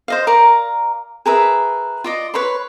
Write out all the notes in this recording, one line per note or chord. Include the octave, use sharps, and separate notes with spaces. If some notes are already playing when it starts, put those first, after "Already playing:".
C5 D#5 F5
A#4 D5 F5 A#5
G#4 A#4 B4 E5
F4 D5 D#5
B4 C#5 B5 C6